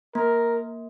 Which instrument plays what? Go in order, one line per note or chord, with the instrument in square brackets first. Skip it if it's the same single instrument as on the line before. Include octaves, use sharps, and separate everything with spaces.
[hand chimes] A#3 [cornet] A#4